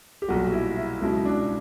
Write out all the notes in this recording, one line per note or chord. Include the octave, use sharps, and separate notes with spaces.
G4
B1 A#2 G3 F#4
E4
E4
C#2 B2 F#3 E4
D4